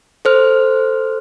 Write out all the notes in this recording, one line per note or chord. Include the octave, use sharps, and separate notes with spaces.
A4 C5 F6